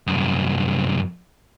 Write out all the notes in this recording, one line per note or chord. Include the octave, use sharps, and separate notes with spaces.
C2 F#2